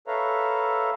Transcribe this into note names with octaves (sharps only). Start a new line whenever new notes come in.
A4 B4 C#5 E5 F5 A#5